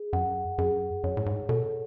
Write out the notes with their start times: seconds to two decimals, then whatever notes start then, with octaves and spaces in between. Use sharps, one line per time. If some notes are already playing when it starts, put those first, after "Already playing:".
Already playing: G#4
0.13 F#2 F#5
0.58 F#2 G#4
1.04 F#2 C#5
1.17 A2
1.26 G#2
1.49 B2 A4